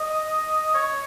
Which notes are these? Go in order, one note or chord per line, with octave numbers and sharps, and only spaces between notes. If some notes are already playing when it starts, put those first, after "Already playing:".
Already playing: D#5
C#5